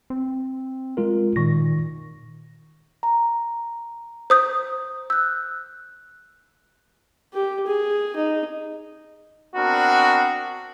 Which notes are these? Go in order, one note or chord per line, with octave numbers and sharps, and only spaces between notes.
C4
G#3 F4 A#4
A#2 D#3 C#6 A#6
A#5
C5 D#6 G6
E6 F#6 G6
G4
G#4
D#4
B3 C4 D4 F#4 A#4